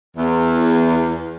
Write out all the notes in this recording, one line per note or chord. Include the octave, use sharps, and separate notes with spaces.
E2